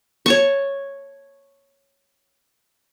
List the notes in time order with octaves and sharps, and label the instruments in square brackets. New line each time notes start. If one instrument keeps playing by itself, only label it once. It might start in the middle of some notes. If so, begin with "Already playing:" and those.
[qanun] C#5 A5 C#6